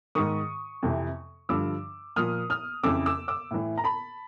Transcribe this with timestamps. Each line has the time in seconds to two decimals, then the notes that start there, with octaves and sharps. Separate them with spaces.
0.15 G#2 D#3 C#6 D#6
0.83 F2 C3 E3
1.49 G2 D3 F3 D6 E6
2.16 A#2 F3 D#6 F6
2.50 D#6 F6
2.83 F2 C#3 E3 D6 E6
3.06 D6 E6
3.28 D6 E6
3.51 A2 E3
3.78 A#5
3.84 A5 B5